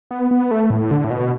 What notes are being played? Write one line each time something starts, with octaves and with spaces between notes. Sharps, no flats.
B3
B3
A3
A2
D3
A2
B2